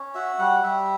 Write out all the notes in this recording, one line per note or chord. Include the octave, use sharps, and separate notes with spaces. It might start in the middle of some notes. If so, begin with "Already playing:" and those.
Already playing: C#4
F#4 E5
G3 F#5
G3 E5